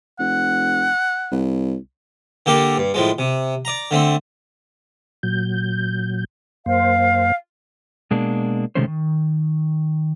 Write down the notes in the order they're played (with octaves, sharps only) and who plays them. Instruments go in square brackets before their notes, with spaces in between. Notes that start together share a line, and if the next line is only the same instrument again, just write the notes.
[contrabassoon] F1 [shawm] F#5
[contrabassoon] C2
[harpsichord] D3 A#3 G4 A4 A#4
G2
A2 F3 G#3
C3
D5 A#5
D3 A3 C4
[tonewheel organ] A#2 F#3 G6
[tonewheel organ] F#2 A#3 C5 [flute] F5
[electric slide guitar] B2 G#3 A#3 D4
C3 D#3 G#3 A3 C#4 C5
D#3